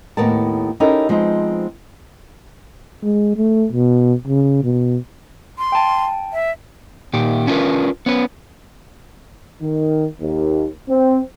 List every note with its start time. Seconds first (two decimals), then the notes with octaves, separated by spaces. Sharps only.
0.17 D#2 A2 B3 A#4 A5
0.80 C#4 D#4 E4 G4 A4 A#4
1.09 F3 G#3 B3 C4 D#4
3.03 G#3
3.37 A3
3.72 B2
4.27 C#3
4.64 B2
5.58 C6
5.72 G5 A5
6.33 E5
7.13 A#2 D#3 G4
7.47 C#4 D4 F4 G#4 A#4 B4
8.06 B3 C#4 B4
9.61 D#3
10.20 D#2
10.89 C4